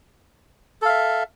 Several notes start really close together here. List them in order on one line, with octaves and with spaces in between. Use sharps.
A4 F5 E5